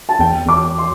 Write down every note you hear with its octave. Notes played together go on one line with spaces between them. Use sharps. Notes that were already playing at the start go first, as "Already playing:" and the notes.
A5
E2 G5
E2 D6
C6